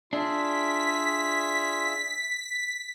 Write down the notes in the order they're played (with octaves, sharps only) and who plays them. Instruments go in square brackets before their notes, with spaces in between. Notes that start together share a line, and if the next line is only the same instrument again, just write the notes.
[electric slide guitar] D4 [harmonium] F4 [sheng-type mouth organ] G#4 E5 [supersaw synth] B6